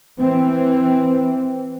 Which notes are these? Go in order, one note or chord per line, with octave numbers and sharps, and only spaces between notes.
E3 C4